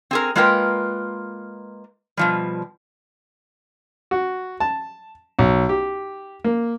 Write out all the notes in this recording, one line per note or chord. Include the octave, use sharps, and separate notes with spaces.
C4 G#4 A#4
G#3 A#3 F4 A#4 B4 G5
B2 F3 G3
F#4
A5
B1
G4
A#3